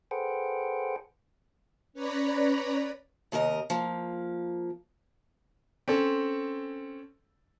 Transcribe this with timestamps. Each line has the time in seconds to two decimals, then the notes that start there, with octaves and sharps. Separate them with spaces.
0.11 G#4 A4 B4 C5 F#5 G5
1.93 C#4 B4 C#5 D5 A#5 B5
3.32 D#2 C3 A#4 D#5
3.70 F3 A#3
5.88 C4 C#4 A4